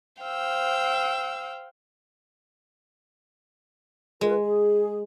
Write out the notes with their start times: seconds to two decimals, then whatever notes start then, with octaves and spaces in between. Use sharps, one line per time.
0.20 C5 F5 G5 E6
4.21 G#3 F4 A#4 B4
4.41 G#4